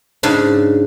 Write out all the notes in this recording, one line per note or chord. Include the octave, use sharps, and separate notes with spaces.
G#2 C#3 D4